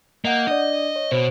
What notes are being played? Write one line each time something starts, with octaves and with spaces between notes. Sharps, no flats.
A#3 D#5 F#5 G6
D4 D5 D#5
C#5
B2 C5 D7